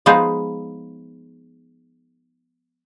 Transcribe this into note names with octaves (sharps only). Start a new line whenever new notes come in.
F3 G#3 B3 D#4 G#4 C5